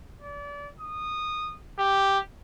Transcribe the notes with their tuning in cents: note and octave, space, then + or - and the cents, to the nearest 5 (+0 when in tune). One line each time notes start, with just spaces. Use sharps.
D5 -30
D#6 -15
G4 +0